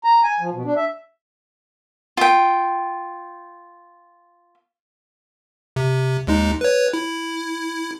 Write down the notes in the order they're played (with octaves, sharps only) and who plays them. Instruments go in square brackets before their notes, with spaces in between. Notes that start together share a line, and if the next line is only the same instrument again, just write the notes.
[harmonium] A#5
G#5
F3
B2
D4
E5
[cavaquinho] F4 G5
[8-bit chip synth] C3
D#2 G#3 D#4
B4 C#5
E4